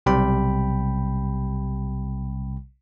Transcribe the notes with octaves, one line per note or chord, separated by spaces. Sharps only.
B1 C3 G3 G5 B5